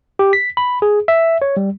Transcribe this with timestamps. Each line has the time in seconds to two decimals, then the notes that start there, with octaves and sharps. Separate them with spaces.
0.19 G4
0.33 B6
0.57 B5
0.82 G#4
1.08 E5
1.42 C#5
1.57 G3